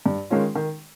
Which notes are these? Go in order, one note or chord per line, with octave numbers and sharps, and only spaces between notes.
G2
D#3 G#3 C#4 F4
D#3